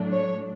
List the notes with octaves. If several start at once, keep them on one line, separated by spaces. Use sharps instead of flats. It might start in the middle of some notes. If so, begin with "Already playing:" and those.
Already playing: A2 F#3 A3 D4
C#5